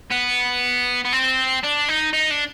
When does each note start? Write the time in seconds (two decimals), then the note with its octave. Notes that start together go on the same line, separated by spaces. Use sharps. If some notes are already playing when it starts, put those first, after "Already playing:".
0.11 B3
1.05 B3
1.13 C4
1.63 D4
1.88 D#4
2.13 D#4
2.30 D4